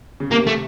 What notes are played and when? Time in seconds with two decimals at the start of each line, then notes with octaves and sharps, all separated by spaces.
0.20 C#3
0.32 C3 A#3
0.47 A3